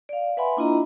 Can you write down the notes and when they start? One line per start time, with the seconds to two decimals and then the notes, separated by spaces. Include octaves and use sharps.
0.09 D5 F5
0.37 B4 E5 F#5 G#5 B5 C6
0.57 A#3 D4 E4 F4 D#5 A#5